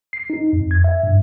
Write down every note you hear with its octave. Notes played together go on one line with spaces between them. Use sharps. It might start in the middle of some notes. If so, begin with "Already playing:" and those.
C7
D#4
F2
G#6
E5
G2